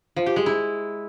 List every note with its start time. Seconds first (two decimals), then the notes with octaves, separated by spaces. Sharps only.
0.16 F3
0.26 G4
0.36 G#3
0.46 E4